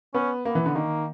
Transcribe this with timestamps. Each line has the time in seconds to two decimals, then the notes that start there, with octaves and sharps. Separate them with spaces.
0.14 B3 C#4
0.45 A#3 B3
0.55 E3
0.66 D3
0.75 D#3 A#3